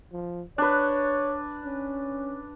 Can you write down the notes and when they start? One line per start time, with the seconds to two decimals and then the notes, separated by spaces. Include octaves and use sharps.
0.12 F3
0.58 D4 B4 C#5
1.64 C#4